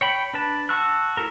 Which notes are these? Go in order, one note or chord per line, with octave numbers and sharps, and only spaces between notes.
C#5 G5 B5
D4 B4 A5
F#4 A5 C#6 E6 F#6
E4 F#4 A4 A#4